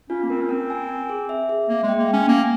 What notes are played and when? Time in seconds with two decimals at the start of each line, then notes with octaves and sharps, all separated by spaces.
0.09 C#4 F4
0.23 A#3
0.30 C4 A#4
0.42 C#4
0.49 C4 A#4
0.70 G#5
0.89 G#5
1.10 G#4
1.29 E5
1.49 G#4
1.69 A#3 E5
1.83 G#3
1.89 G5
1.99 A#3
2.08 C#4 G5
2.28 A#3 G#5